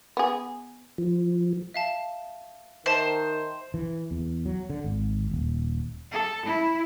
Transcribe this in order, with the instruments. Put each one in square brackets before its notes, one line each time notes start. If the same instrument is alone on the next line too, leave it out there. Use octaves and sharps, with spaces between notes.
[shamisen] B3 G#4
[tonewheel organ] F3
[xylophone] E5 F5 A5
[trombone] D#3 [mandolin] C5 [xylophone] E5 A5
[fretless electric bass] E3
E2
F#3
D3
G#1
D#1
[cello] A4
E4